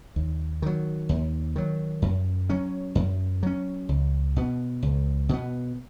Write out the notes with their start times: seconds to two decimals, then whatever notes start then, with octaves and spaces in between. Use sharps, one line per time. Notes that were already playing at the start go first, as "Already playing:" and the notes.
0.16 D#2
0.62 D#3 F#3
1.09 D#2
1.56 D#3 F#3
2.02 F#2
2.50 F#3 C#4
2.95 F#2
3.43 F#3 C#4
3.89 C#2
4.36 B2 B3
4.83 C#2
5.29 B2 B3